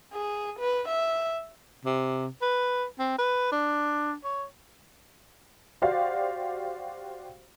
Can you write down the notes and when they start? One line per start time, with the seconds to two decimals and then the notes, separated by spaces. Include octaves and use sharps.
0.13 G#4
0.59 B4
0.88 E5
1.86 C3
2.42 B4
2.99 C4
3.19 B4
3.52 D4
4.24 C#5
5.82 F#4 G4 C5 D5 F5